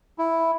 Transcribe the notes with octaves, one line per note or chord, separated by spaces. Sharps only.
E4